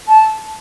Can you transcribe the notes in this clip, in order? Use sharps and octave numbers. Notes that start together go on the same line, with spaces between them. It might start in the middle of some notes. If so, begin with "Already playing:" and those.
A5